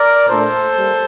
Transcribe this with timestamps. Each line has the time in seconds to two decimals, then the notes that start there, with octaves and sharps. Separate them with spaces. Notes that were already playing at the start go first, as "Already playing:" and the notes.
Already playing: A#4 D5
0.27 A#2 A3 D4 A4 C5
0.75 G3 A#3